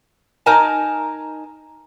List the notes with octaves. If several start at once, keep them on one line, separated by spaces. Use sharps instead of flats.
D#4 A#4 G#5 A5